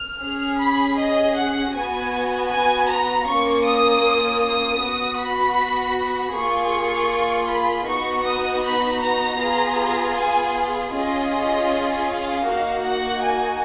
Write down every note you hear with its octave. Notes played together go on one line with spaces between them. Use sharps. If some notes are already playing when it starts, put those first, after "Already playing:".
Already playing: F6
C#4 G#4
B5
D#5
F#5
B3 F#4 G#5
G#5
A#5
A#3 C#4 F4 C#6
D#6
D#6
B3 F#4
B5
A#3 F4 G#4 C#6
B5
B3 D#4 F#4 C#6
D#6
B5
A#5
B3 F4 G#4
G#5
C#4 F4 G#4 D#5
F5
A#3 D#4 F#4
F#5
G#5